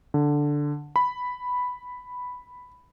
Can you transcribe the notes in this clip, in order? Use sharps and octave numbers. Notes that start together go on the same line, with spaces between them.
D3
B5